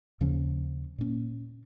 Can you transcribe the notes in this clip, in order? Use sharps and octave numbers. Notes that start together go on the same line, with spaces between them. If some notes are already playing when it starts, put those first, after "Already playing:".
D#2 C#3 F3 C#4
A#2 A#3 C#4